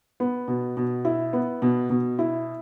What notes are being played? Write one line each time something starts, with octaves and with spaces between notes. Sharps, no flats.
B3
B2
B2
E4
B3
B2
B2
E4